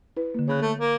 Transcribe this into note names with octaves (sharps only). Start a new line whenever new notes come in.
E4 B4
D3 A#3
C#3 C#5 B5 F#6
A3
A#3